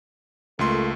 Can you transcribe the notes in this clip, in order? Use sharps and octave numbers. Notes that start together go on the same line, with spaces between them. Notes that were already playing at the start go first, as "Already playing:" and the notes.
C#2 A3 A#3 F4 A4 C6